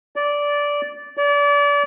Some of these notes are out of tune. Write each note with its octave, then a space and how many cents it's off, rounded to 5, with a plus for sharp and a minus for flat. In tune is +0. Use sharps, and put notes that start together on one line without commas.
D5 -15
D5 -35